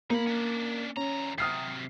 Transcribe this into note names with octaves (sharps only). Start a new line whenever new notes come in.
A#3 D#4 B5
C#4 D4
E2 C#4 A#5
C3 F#3 D#6 F6 C7